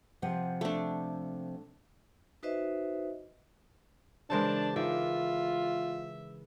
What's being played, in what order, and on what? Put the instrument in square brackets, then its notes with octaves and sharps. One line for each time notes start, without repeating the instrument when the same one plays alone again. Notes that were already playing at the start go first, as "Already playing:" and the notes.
[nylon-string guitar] C3 F3 F#5
[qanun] A3 D4
[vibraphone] D#4 F#4 B4 C5 D#5 E5
[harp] C#3 E3 G#3 [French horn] D4 [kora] A#4 C5 C#5 [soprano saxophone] A5
[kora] D#3 G#4 D5 [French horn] F4 [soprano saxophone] E5